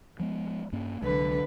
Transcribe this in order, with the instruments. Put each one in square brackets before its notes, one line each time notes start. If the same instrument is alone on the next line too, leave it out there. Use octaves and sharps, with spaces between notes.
[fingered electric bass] F3 G#3 B3
G2 A#3 C#4
[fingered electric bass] C2 F#3 G#3 [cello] D3 B4